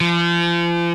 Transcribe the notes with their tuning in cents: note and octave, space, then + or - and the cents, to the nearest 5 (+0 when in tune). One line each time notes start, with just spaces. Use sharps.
F3 -35